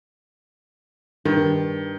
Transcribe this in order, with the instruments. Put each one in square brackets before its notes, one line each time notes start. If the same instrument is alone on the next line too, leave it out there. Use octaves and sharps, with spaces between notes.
[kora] G2 [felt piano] D#3